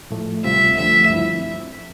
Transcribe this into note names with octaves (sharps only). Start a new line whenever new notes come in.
A2 F3 A3
D2 C3 G3 C4 F4 E5
D2 D3 F3 A3 E5
G2 F3 C4 E4